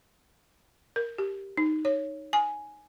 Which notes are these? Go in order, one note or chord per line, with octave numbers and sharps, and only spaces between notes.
A#4
G4
D#4
C#5
G#5